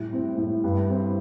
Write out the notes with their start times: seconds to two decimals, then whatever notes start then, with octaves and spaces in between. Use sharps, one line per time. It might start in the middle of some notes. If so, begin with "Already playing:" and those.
Already playing: A2 G3
0.13 C4
0.37 A2
0.64 G2
0.90 C4